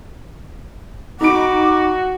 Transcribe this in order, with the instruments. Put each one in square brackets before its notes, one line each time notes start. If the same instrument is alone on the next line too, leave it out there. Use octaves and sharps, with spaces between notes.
[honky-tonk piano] D#4 B5 D7 [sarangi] F#4 [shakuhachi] D6